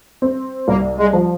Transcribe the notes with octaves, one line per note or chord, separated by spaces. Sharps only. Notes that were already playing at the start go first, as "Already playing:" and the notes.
C4
C2 A#3
G#3
F3